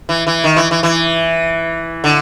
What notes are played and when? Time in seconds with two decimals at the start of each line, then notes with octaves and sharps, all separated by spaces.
0.09 E3
0.27 E3
0.44 D#3
0.57 E3
0.71 E3
0.83 E3
2.04 D3